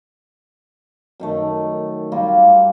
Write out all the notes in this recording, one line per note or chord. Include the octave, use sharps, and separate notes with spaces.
F#2 D#3 A3
G3 A#3 F4